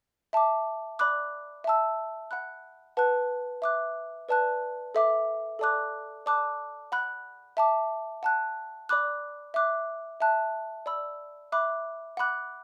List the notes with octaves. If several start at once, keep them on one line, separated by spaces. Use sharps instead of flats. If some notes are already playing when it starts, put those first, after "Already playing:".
E5 A5 D6
D5 B5 D6 F#6
E5 A5 E6
F#5 B5 F#6
B4 F#5 A5 F#6
E5 D6 F#6
B4 D5 A5 F#6
A4 E5 D6
A4 D5 A5 D6 F#6
D5 A5 D6 F#6
F#5 B5 F#6
E5 A5 D6
F#5 A5 F#6
D5 B5 D6 F#6
E5 D6 F#6
E5 A5 F#6
D5 B5 E6
E5 B5 D6 F#6
F#5 B5 D6 F#6